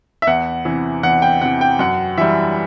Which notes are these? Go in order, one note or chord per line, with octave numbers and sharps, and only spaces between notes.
E5
E2 F#5
C3 E3
E2 F#5
G5
C3 E3 F#5
G5
F#2 F#5
E3 G3 E5